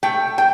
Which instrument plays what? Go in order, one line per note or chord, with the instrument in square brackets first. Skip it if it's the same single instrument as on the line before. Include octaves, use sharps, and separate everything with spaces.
[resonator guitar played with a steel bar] A3 G5
G5